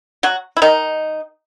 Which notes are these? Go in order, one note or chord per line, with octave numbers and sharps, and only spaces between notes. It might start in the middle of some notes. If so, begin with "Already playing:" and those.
F#3 F#4
E4
D#3 D#4